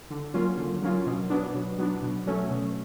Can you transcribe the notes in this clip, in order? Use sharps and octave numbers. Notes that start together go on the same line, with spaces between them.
D3
F#3 A#3 C#4 F4
D3
F#3 A#3 C#4 F4
B2
F#3 B3 D4
B2
F#3 B3 D4
B2
F#3 A3 C#4
B2